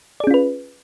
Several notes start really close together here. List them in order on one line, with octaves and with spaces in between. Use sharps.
D5 G#4 C#4 F4 B4